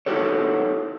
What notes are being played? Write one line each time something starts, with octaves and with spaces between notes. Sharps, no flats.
D#4 E4 F#4 G4 A4 C#5